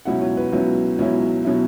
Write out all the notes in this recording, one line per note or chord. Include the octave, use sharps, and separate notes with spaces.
C#2 B2 F#3 C#4 E4 F#5
C#5
B4
C#2 B2 F#3 C#4 E4
C#2 B2 F#3 C#4 E4
B2 F#3 C#4 E4